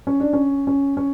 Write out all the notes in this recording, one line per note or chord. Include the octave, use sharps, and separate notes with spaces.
C#4
D4
C#4
C#4
C#4